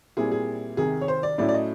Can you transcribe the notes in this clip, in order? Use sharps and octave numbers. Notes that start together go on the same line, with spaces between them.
A#2 G3 C4 E4 G#4
G#4
C2 C3 D#3 G#4
C#5
C5
D5
A2 F#3 A3 C#4 E4 D5
D5
D#5